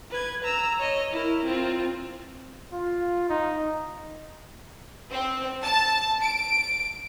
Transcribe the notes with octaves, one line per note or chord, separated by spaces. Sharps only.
B4 G#6
A#5 E6
C#5 D#5
E4 A#4
C4 F4
F4
D#4
C4
A5
D7